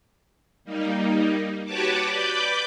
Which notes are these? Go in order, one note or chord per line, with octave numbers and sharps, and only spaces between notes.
G3 A#3 D#4
F#4 G4 B4 C#5 A5 D6
B4 D5 B5 D6 G6